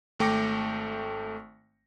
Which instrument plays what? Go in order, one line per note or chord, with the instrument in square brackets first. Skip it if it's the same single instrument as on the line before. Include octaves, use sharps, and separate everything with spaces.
[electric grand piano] G#1 A3 G5 D6 A#6 C#7